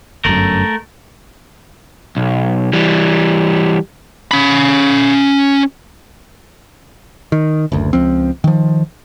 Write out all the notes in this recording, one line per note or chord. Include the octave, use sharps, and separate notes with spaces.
G1 F#2 A3 A#4
B1
E3 G3
C#4 B5
D#3
F#1 D2
C#2 F3 C4
D#3 F3